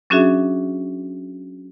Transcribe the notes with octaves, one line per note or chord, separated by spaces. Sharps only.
F#3 C#4 D4 F#4 G#4 E5